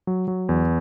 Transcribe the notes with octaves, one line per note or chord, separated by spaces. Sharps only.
F#3
F#3
E2